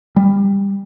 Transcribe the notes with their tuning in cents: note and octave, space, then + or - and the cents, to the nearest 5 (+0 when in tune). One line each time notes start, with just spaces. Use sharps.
G3 +20